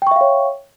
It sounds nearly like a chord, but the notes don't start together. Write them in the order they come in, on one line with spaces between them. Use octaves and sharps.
G5 C#6 E5 F5 C#5